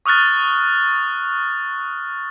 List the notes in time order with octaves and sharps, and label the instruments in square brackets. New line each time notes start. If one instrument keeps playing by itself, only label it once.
[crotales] C#6 D#6 F6 F#6 A6